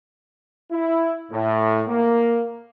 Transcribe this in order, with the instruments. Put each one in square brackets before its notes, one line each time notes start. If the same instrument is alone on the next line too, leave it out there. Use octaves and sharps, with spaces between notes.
[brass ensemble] E4
A2
A#3